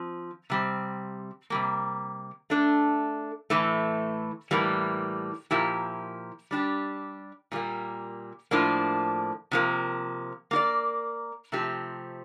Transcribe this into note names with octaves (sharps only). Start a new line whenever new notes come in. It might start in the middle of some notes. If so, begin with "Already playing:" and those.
Already playing: F3 C4
C3 G3 C4
C3 G3 A#3
A3 D4 A4
A2 E3 A3
A2 E3 G3 A#3
A#2 F3 A#3 E4 G4
G3 D4 G4
A#2 G3 A#3
A2 F3 A#3 D4
C3 F3 A#3
A#3 F4 A#4 D5
C3 F3 A3 C4 G4